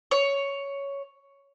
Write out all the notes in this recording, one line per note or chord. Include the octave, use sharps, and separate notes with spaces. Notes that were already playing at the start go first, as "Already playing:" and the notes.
C#5